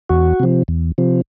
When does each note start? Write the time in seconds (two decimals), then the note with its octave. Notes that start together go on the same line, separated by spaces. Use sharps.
0.09 E2 F#4
0.40 C3 F3
0.68 E2
0.98 C3 F3